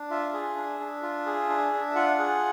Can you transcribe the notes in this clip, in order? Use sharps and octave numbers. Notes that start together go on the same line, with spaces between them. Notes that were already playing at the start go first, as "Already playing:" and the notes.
Already playing: D4
F4 E5
G#4
D4
D4
F4
G#4
D4
D4
F4 F#5
G#4